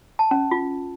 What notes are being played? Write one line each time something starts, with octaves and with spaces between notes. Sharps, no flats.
A5
C#4
F4